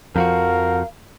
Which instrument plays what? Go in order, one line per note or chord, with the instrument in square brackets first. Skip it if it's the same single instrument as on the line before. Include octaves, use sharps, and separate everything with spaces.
[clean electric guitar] F2 F3 F#4 [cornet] A#4 [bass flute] F5